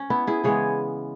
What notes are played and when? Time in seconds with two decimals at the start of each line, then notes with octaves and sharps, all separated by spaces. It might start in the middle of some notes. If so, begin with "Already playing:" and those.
Already playing: C#4
0.10 B3 E4
0.27 E4 G#4
0.44 C#3 E3 G#3 B3 G#4 C#5